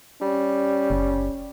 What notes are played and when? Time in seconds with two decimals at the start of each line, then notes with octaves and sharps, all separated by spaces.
0.22 G3 C#4
0.90 F#1